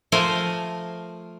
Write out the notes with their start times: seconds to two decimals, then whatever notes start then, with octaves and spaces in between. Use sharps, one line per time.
0.12 F3 A3 F4 A#4 C5 G#5